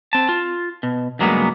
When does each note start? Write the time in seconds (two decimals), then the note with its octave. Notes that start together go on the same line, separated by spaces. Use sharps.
0.13 C4 A5
0.29 F4
0.83 B2
1.19 C#2 G2 F#3 G#3 A#3 B3